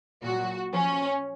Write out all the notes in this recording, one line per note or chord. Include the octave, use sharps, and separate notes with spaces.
A#2 F#3 F#4
F3 C#4